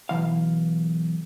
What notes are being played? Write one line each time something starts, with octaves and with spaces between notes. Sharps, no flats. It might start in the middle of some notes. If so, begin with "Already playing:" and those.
B1 F2 E3 F5